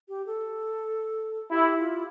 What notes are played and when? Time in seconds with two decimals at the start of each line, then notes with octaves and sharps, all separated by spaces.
0.09 G4
0.26 A4
1.51 E4 G4
1.79 F4